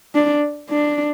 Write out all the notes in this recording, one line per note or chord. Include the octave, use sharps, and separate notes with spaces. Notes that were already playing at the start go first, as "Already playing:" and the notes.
D4
D4